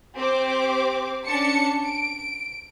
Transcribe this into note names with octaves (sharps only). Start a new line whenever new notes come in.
C4 G4 C5 D6
C#4 D4 A5 C#7
D7